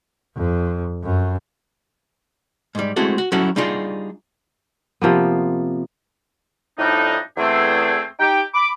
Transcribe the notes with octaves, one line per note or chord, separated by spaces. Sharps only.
F2
F#2
G#2 G3
G#3 A3 C4 E4 F#4 A4
F#4
F#3 G3 C#4 E4 F#4 A4
G3 D4 D#4 F4 G#4
C3 F3 A#3 B3
F2 A2 G3 D4 D#4
E2 A3 C4 G#4
D#4 G4 G5
B5 D6